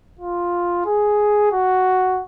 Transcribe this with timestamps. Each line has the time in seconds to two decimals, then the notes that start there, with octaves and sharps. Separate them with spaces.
0.19 F4
0.86 G#4
1.52 F#4